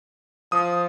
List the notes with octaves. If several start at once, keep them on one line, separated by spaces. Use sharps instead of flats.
F3 D#6